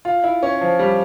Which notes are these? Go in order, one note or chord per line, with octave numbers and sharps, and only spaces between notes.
F4
E4
C#4
F3
G3